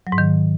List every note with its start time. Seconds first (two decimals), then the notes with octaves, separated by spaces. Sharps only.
0.07 F#3
0.12 G#2
0.18 D#3